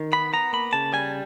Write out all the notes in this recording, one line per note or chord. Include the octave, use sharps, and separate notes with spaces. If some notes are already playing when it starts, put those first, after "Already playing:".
Already playing: D#3
B3 B5
B3 A#5
A#3 B5
C#3 A5
G3 G#5